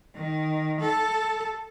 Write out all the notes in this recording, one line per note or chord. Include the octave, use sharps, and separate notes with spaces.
D#3
A4